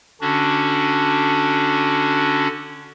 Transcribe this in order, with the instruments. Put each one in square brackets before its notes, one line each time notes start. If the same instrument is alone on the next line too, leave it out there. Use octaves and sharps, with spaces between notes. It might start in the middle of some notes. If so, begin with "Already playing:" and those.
[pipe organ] D3 C#4 D4 F#4